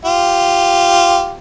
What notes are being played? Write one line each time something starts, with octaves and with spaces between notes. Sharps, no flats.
F4 G4